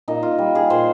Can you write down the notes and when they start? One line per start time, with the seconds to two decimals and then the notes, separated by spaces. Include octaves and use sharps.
0.08 A#2 D#4
0.23 F4
0.38 G3
0.55 G#4
0.70 A#2 C5